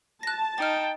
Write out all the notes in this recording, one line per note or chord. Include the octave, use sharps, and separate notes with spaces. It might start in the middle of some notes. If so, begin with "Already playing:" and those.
A5 F#6 A#6
D#4 G5 F6 A6